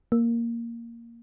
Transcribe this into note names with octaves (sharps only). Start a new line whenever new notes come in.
A#3